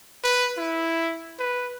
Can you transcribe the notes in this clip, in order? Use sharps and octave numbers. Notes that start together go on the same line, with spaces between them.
B4
E4
B4